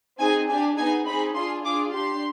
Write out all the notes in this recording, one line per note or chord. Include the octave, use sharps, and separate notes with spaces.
C4 D#4 G#4 G#5
D4 G4 G#5
B3 D#4 G#4 G#5
C4 D#4 G#4 B5
D4 F4 G#4 C6
D4 F4 G#4 D6
D4 G4 C6